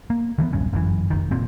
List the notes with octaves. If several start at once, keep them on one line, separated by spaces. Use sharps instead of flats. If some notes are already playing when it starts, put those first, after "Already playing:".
A#3
D#3 E3 A3 B3
D#1 B1 G2 C#4
G1 F#2 C3 E3
F1 C2 D#3
F1 A#2 C4